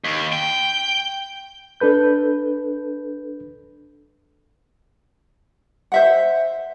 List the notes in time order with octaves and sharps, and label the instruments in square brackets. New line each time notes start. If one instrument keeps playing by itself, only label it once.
[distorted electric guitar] D#2
G5
[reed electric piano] D4 A4 B4 G6
[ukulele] C5 E5 F#5